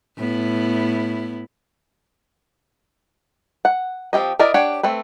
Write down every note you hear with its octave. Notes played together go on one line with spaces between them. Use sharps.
A2 B3 E4
F#5
F3 C4 F4 G4 D#5
E4 A#4 D5 D#5
D4 G4 C#5 F#5
A3 C4 B4